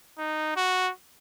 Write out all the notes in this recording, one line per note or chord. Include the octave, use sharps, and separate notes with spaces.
D#4
F#4